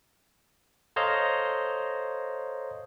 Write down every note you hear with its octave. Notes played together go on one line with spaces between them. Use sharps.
A4 C5 C#5 D#5 F5 A#5